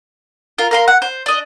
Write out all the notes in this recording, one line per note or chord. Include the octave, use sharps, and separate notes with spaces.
F4 A#4
A#4 F5 C6
F#5
C5
D4 D#5